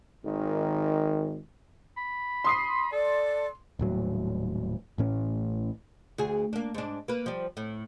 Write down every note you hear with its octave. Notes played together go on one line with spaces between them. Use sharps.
G#1 D#3
B5
C6 D#6 C7
A4 D5
D#1 A2 F#3
A1 A2 C#4
D2 G#4
A#3 D4
G#2 D4
A#3 B4
F3 G3
A2